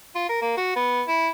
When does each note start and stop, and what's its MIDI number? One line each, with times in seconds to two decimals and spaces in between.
0.15 0.25 65
0.29 0.39 70
0.42 0.57 58
0.57 0.76 66
0.76 1.03 59
1.08 1.29 64